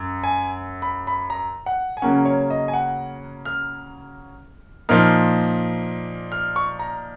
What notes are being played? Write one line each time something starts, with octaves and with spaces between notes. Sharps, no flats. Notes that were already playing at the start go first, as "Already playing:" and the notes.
Already playing: F#2
G#5
B5
B5
A#5
F#5
G#5
C#3 F#3 A#3 C#4 F#5
C#5
D#5
G#5
F#5
F6
A#2 F3 A#3 D#4 F6
F6
C#6
A#5